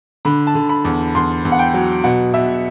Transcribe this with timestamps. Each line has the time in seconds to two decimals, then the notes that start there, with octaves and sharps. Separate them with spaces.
0.25 D3 B5
0.47 A5
0.55 D3
0.69 B5
0.85 E2
1.15 E2 C6
1.45 E2
1.52 F#5
1.59 G5
1.74 F#3
2.04 B2 F#5
2.34 B2 E5